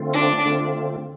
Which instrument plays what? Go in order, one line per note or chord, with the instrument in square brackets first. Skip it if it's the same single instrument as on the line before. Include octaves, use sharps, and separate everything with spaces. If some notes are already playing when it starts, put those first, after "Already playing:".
Already playing: [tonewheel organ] D3 A3 C4 F4
[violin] D4
[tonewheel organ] D3 A3 C4 F4